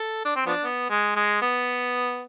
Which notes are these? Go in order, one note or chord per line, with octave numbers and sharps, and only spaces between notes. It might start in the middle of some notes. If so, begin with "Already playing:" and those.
Already playing: A4
D4
C4
F3 B3 D4
B3
G#3
G#3
B3